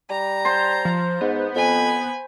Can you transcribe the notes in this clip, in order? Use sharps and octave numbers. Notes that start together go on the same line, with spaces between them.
G3 A#5
C5 A5 C6
F3
G#2 B3
F2 G#5 B5